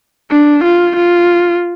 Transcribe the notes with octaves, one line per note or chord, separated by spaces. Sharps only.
D4
F4
F4